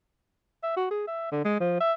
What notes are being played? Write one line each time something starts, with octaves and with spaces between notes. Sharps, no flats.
E5
F#4
G#4
E5
D3
G#3
F3
E5